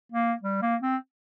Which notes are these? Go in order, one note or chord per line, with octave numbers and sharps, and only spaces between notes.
A#3
G3
A#3
C4